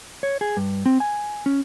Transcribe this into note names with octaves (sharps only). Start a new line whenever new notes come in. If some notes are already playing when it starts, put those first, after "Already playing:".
C#5
G#4
G2
C4
G#5
C#4